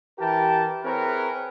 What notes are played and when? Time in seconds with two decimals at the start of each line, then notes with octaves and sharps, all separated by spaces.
0.19 E3 G4 A#4 G5 A5
0.83 C4 E4 G#4 A#4 B4 C#5